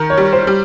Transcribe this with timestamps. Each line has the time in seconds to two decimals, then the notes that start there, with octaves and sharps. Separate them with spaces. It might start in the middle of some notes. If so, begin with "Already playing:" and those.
Already playing: D#3 A#4
0.10 C#5
0.17 G3
0.32 C5
0.47 G3